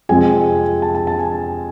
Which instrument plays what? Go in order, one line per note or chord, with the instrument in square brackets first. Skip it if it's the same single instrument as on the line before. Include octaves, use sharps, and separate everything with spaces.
[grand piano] F2 C3 F3 G#3 C4 G#5
A5
A5
A5
G#5